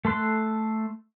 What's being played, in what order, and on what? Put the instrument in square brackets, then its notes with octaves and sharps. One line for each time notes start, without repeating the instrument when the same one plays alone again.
[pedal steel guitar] A3 A4 C6 F#6